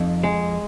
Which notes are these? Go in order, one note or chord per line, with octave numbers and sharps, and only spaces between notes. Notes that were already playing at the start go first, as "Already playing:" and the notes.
Already playing: F2 D#4
G#3